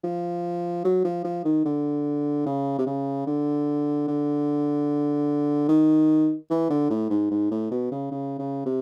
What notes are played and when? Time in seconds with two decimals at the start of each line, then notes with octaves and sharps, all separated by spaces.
0.04 F3
0.84 F#3
1.04 F3
1.24 F3
1.45 D#3
1.65 D3
2.46 C#3
2.79 C3
2.86 C#3
3.27 D3
4.08 D3
5.69 D#3
6.50 E3
6.70 D3
6.91 A2
7.10 G#2
7.31 G#2
7.51 A2
7.71 B2
7.92 C#3
8.12 C#3
8.39 C#3
8.66 C3